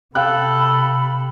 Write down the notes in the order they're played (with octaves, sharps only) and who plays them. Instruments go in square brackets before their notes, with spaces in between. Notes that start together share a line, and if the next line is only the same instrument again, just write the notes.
[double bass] C3 [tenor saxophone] A4 [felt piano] F5 G5 F#6 [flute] B5